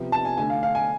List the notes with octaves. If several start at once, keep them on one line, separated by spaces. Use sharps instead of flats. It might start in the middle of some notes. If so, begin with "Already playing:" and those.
Already playing: C3 F3 B3
A5
G#5
D3 A3 D4 G#5
F5
F5
G#5